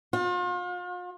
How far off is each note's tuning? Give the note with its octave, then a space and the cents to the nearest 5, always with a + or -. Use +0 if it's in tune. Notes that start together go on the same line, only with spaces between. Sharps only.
F4 +40